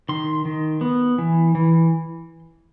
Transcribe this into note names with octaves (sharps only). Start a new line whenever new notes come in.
D#3 C6
D#3
B3
E3
E3